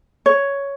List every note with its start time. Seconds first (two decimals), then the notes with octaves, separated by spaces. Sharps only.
0.26 C#5